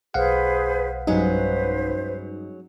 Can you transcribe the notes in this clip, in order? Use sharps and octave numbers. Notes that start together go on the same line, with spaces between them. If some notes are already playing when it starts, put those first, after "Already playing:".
B1 G#4 B4 C5 F5 F#5
G2 F#3 G#3 C#4 D#4 B4 C5